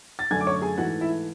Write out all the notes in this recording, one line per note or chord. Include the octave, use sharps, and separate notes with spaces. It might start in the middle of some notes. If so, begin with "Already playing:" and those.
A6
F#2 D3 A3 G#5 G#6
D6
C#5 C#6
G#4 G#5
G#2 E3 A3 F#4 F#5
E4 E5